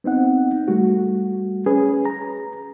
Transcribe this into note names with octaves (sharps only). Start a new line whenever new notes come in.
B3 C4 D#4 F#5
G3 A3 F#4
C#4 G#4 B4
A#5